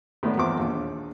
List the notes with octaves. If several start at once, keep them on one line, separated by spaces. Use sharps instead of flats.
A2 D#3 A3 B3 D4
E2 F3 B3 C4 D6
A#1 D#2 F4